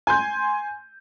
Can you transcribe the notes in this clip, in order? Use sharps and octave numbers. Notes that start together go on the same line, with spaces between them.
G#5 C6 G6